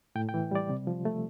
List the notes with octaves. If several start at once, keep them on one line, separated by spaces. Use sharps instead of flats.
A2 G5
G5
E3
G3 D5
C3
F3
A3